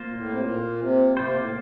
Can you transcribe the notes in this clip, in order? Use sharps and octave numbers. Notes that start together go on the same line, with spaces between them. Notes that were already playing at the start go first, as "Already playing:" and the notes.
Already playing: A#3 F4 C5
A#2
A2
C3
A#2
C3
C3 A#3 F4 C5
A2